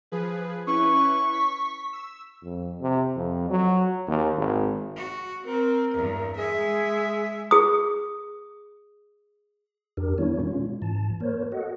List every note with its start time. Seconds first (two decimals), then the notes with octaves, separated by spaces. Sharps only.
0.12 F3 G#4 B4
0.67 C#4 E4 B4 C#6
1.33 B6
1.93 E6
2.43 F2
2.81 C3
3.16 F2
3.50 F#3
4.07 D#2
4.37 G#1
4.96 F#4
5.45 C4 A#4
5.95 E2 G2
6.36 G#3 G#4 E5
7.51 G#4 D#6
9.97 F2 D4 G4 A#4
10.18 D#3 G3 B3 D4 E4 C#5
10.40 B2 G#3 C#4 F4
10.82 G#2 E3 A5
11.20 A#3 A#4 C5 C#5
11.52 F#4 A4 D#5 F#5